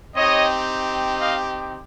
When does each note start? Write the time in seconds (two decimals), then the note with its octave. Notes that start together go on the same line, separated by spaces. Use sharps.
0.15 C4 D#4 G4 C#5 D#5
1.19 D#5 F5